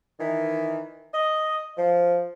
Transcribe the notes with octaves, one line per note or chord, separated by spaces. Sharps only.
D#3 E3
D#5
F3